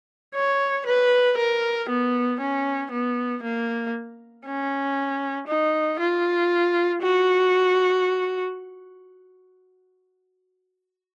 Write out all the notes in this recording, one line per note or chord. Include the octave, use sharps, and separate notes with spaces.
C#5
B4
A#4
B3
C#4
B3
A#3
C#4
D#4
F4
F#4